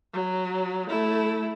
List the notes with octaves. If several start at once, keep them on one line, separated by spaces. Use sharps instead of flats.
F#3
A3 E4